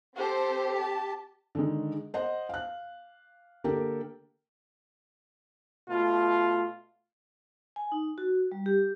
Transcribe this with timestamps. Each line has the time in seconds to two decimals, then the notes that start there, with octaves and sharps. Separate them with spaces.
0.17 C4 G4 A4 C5
0.78 A5
1.55 D3 D#3 G#3
2.14 C5 D#5 F#5
2.49 F5 F#6
3.64 D3 A#3 G4 A4 A#4
5.89 B2 A3 F4
7.76 G#5
7.92 D#4
8.18 F#4
8.52 G3
8.66 G4